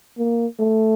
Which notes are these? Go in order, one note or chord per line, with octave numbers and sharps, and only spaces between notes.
A#3
A3